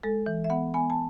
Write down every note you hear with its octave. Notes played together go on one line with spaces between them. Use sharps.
G#3 A4
E3
E5
B3 F#5
B3 G#5
A5